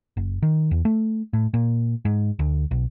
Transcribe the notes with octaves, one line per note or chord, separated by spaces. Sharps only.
F#1
D#3
E2
A3
A2
A#2
G#2
D2
B1